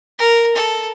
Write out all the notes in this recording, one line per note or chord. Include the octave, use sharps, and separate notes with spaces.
A#4
A4